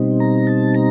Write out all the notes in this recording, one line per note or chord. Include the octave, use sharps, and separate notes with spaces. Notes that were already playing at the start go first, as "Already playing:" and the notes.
Already playing: B2 G3 C4 D#4
A#5
A5
A#5